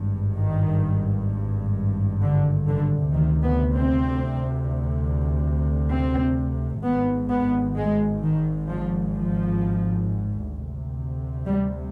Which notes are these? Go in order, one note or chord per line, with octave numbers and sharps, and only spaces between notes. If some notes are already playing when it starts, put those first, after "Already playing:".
Already playing: G#1 G2
D#3
D3
D3
D2 C3 D#3
B3
C4
C4
G#1 G#2 B3
B3
G#3
D#3
F3
F3
D2 C3
G3